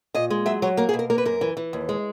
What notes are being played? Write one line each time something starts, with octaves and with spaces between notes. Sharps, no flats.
A#2 D#5
G#3
F#3 E5
F#3 C#5
A#3 A#4
G#4
B2
A#4
A#3 A#4
B4
F#2 A#4
E3
E3
D#2
G#3